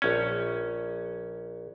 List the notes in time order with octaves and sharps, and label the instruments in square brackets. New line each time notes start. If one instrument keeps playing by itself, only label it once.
[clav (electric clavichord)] A#1 C#4